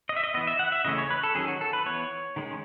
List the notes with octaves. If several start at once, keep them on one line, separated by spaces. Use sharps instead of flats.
D#5
E5
D#5
E3 B3 D#5
E5
F#5
E5
C#3 E3 A3 C#4 D#5
C#5
B4
A4
D#3 F#3 C#4 G#4
F#4
A4
B4
E3 B3 C#5
D#3 G#3 C#4